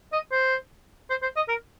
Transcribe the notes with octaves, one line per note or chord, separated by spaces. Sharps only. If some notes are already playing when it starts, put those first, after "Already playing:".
D#5
C5
C5
C5
D#5
A#4